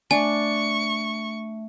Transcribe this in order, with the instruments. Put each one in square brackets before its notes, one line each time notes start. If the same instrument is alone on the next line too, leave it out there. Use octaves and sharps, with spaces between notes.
[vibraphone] A3 E5 [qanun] D4 [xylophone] G#5 [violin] C#6